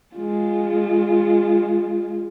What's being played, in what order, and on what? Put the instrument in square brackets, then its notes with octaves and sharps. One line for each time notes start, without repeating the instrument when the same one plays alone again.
[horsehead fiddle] G#3 F4